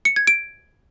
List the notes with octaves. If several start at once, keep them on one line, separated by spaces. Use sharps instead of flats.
C#7
G#6
D7